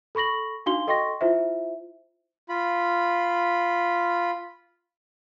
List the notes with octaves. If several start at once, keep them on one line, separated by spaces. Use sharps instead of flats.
A4 B5 C#6 A#6 F#7
D4 D#4 F#4 F5 C6 G7
A4 D#5 G5 C6 C#6 A#6
E4 F4 C5 E5
F4 B5